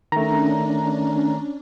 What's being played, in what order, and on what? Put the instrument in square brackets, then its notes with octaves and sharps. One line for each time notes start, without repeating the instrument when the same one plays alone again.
[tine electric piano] D#3 A3 [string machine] C#4 D4 [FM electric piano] A#5